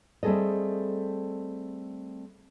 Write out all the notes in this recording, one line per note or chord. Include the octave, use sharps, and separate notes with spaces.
G3 A3 C4 G#4 A4 D#5